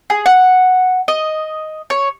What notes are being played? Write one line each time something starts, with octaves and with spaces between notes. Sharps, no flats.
G#4
F#5
D#5
C#5